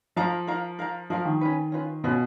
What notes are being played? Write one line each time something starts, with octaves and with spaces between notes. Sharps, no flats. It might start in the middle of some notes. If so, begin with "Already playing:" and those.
F3 A#4 F5 A#5
A#4 F5 A#5
A#4 F5 A#5
F3 A#4 F5 A#5
D#3
C#4 F4 B4
C#4 F4 B4
B2 C#4 F4 B4